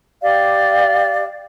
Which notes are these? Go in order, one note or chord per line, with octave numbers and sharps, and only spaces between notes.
G4 D5 F5